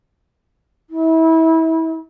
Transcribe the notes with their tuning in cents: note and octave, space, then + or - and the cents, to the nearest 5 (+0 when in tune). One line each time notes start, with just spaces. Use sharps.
E4 -30